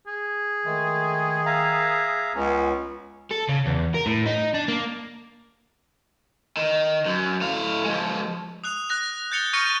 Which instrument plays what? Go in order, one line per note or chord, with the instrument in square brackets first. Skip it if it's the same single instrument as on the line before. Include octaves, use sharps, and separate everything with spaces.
[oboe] G#4
[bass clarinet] D#3 [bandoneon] G#3 A3
[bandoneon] E5 F5 A#5
[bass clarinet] C#2 [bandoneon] B3 C#4
[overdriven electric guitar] A4
C#3
E2
A#4
A2
D#4
D4
A#3
D#3
F#2
A2 F5
F3 G#3
[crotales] D#6 F#6 F7
F#6 A#6 F7
G6 A6 C#7 F7 G7
C#6 F6 G6 A#6 C#7 D#7